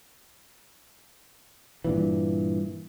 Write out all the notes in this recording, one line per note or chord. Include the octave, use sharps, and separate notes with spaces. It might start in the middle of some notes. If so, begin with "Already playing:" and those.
G2 A#2 E3